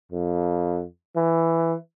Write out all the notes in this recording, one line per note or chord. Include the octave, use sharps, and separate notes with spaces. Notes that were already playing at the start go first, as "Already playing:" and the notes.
F2
E3